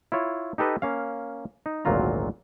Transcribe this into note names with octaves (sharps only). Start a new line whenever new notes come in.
E4 F4 C#5
D#4 G4 A4 B4 D#5
A#3 C#4 F5
D#4
G#1 D2 A#2 F#3 F4 A#5